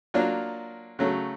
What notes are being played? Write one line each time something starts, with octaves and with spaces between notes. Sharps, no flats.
F#3 A#3 D4 F4
C#3 F#3 A3